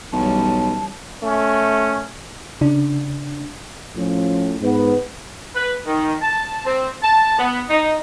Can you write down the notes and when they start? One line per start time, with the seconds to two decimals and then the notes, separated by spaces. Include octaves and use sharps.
0.13 B1 E3 G3 C#4 A5
1.23 A3 C#4
2.61 C#3 D4
3.96 A2 F3 C#4
4.61 G#2 B3
5.55 B4
5.85 D#3
6.22 A5
6.66 C4
7.02 A5
7.39 B3
7.69 D#4